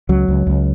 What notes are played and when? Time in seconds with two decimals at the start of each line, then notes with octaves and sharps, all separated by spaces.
0.09 C#2 F#3
0.28 C#2
0.47 C#2